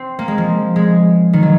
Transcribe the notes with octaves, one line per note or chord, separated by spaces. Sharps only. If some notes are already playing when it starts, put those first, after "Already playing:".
Already playing: C4
A#3
G#3
F3
G#3
D#3
F#3